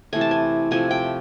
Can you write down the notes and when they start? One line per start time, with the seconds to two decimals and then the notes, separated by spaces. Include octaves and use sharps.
0.13 C3 E3 A3 G#5
0.21 A5
0.31 G#5
0.71 C3 F3 A3 G#5
0.91 G5